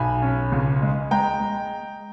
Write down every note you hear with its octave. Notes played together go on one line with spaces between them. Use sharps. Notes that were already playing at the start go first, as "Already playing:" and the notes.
Already playing: B1 B2 G#5 B5
C#4
C#2
G#3
G#3 G5 A#5
G#3